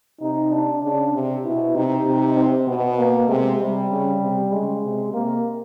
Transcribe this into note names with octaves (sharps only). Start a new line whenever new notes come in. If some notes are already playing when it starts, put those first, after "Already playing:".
C3 D#4
D4
C#3 D4
C3
B2 E4
C3 D#4
C3
C4
B2 B3
A#3
C3 G#3
C3 G3
C#3
C3
C#3 G#3
C3
C3 A#3